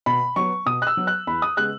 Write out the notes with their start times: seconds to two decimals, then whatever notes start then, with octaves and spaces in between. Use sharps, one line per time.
0.06 B2 B5
0.36 F#3 B3 C#6
0.66 B2 D#6
0.82 F#6
0.87 E6
0.97 F#3 B3
1.07 F#6
1.27 E2 B5
1.42 D#6
1.57 C#3 G#3 B3 F#6